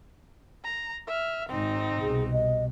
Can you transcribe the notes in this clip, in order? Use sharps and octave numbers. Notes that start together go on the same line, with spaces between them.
A#5
E5 F6
G#1 G#2 C4 D#4
C2 B2 G#4
D#5